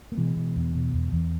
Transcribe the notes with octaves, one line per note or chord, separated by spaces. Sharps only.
A#3
B2 E3 G#3
B2
E2
B2
E2
E2